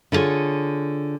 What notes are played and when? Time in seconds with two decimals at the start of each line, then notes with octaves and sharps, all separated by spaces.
0.12 D3 E4 F4 G#4 C#5